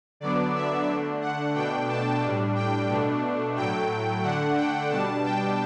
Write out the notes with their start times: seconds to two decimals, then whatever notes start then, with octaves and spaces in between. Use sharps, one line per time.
0.20 D3 F#3 B3 D4 D5
0.54 E5
0.88 D3 A3 D4
1.21 F#5
1.55 B2 A3 D4 G5
1.89 A5
2.22 A2 G3 D4
2.55 G5
2.89 B2 A3 D4
3.56 A2 F#3 A3 G5
4.23 D3 A3 D4 F#5
4.57 G5
4.90 B2 G3 D4 A5
5.24 G5